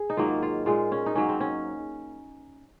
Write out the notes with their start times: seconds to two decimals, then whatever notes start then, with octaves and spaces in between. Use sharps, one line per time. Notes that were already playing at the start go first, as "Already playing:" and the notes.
Already playing: G#4
0.10 D#4
0.17 G#2 D#3 F#3 A#3 F4
0.42 F4
0.66 A#2 G#3 F4
0.92 C#4
1.06 D#4
1.15 G#2 F#3 A#3 C#4
1.29 C4
1.40 C#4